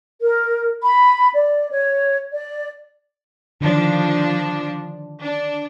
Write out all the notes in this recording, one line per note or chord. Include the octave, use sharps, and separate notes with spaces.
A#4
B5
D5
C#5
D5
D3 D#3 F3 D4
D4